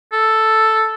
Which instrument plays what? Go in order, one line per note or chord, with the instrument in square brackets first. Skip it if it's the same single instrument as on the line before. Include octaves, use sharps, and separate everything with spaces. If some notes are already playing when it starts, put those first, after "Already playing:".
[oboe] A4